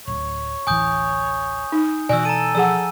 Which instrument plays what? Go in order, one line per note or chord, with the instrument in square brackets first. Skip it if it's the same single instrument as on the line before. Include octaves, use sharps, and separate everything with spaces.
[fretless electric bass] D1 [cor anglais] C#5
[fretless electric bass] D1 A1 E3 [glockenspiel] G#5 D#6 G6
[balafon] D#4
[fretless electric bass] B2 E3 [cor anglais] F#4 [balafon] D5 [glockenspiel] G#5 E6
[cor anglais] A4 [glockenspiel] A#5 D#7
[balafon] F3 G#4 F#5 [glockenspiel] E6